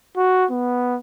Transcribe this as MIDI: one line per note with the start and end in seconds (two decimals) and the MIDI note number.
0.17 0.46 66
0.51 0.97 59